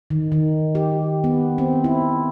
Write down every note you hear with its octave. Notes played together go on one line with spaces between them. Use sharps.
D#3
D#3
G4
B3
C4
E4